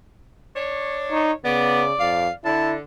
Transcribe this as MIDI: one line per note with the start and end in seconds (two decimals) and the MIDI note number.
0.56 1.31 62
0.56 1.31 73
1.11 1.33 63
1.45 1.93 49
1.45 1.84 59
1.45 2.35 74
2.00 2.29 41
2.00 2.32 77
2.45 2.80 50
2.45 2.75 64
2.45 2.72 81